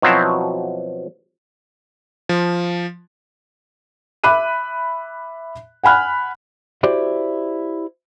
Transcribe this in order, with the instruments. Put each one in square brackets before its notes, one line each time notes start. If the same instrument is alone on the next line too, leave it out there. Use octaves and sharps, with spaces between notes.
[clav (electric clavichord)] B2 F3 F#3 C4 E4
[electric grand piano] F3
[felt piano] E5 B5 D6 F#6 D#7
F#5 G#5 B5 F6 F#6
[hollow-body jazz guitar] E4 F#4 G4 C5 D5